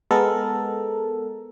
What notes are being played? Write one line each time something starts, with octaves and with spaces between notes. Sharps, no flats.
G#3 B3 A4 A#4